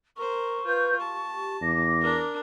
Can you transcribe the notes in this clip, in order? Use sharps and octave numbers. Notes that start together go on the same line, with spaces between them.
A#4 C5 C#6
F4 B4 G6
G4 A5
E2 D6 A#6
D4 A#4